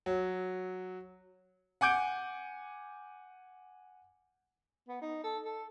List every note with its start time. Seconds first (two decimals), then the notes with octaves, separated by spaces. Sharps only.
0.06 F#3
1.81 F#5 G#5 D6 G6 D7
4.88 B3
5.02 D#4
5.24 A4
5.45 A4